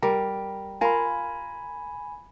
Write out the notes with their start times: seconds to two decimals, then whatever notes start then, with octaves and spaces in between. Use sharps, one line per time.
0.02 G3 A#4
0.81 F4 A#4 G#5 B5